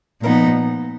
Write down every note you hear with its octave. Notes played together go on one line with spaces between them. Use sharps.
A#2 F3 B3 D#4 A#4